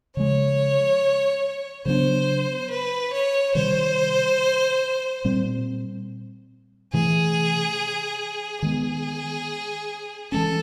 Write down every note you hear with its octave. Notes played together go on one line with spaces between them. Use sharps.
C#3 F3 G#3 C#5
C#3 F#3 B3 D4 C5
B4
C#5
C3 D#3 G3 C5
A#2 G3 C4
C3 E3 A3 G#4
D#3 G#3 B3 G#4
E3 G#3 C#4 A4